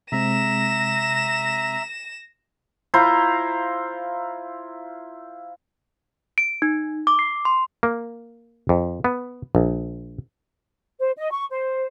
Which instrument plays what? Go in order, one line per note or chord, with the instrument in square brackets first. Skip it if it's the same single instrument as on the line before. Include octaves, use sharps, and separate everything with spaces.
[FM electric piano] C3 G#3 C4 [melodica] E5 A#5 [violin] A#6 E7
[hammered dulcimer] E4 F4 C5 A#5
[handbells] D7
D#4
D6
C7
C6
[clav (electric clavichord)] A#3
F2
B3
A#1
[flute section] C5
D#5
C#6
C5